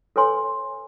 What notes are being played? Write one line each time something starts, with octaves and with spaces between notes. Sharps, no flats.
A4 B4 C#5 G#5 C6